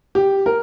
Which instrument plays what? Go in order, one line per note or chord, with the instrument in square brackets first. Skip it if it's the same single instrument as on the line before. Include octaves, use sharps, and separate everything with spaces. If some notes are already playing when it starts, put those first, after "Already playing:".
[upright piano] G4
A#4